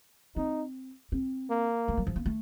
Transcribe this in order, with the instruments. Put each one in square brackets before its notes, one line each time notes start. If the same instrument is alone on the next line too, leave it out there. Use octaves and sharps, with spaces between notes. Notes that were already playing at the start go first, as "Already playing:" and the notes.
[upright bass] C4 [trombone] D#4
[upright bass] C4
[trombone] A#3
[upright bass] A3
F#3
F3
A#3
A3